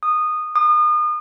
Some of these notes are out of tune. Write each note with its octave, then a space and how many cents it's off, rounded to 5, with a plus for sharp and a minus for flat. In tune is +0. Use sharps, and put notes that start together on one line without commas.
D#6 -15
D#6 -35